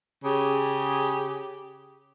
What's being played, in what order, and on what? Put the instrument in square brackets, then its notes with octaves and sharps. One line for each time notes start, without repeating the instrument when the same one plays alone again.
[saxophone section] C#3 G4 G#4